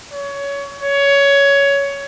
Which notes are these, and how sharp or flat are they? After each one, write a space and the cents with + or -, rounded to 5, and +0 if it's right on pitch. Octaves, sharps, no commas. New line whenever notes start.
C#5 +20
C#5 +15